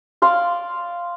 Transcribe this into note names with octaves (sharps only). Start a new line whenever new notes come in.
D5 F5 C6